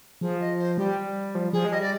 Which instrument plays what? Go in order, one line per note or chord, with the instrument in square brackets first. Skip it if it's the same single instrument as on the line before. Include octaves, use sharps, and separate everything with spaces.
[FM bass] F3 [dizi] G#4
[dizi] D#5
C5
[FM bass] G3 [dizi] G4
[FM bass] F3
[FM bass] F3 [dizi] G#4
[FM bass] G#3
[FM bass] G3 [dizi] D#5
[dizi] D5